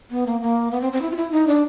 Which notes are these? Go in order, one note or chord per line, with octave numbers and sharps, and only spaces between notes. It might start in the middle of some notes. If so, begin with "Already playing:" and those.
B3
A#3
A#3
B3
C4
C4
E4
F4
E4
D#4
D4